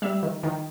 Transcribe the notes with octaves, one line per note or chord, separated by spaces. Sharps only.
G3 E5
D#3
D#3